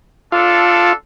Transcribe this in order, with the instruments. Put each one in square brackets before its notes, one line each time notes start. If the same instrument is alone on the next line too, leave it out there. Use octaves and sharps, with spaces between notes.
[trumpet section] D4 A4 [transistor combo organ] F4